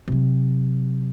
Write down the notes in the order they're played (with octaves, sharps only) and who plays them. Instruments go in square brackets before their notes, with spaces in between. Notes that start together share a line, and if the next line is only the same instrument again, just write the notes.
[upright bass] C3 F#3